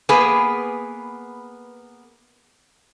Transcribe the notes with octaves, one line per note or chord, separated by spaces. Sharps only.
A#3 B3 G#4 B4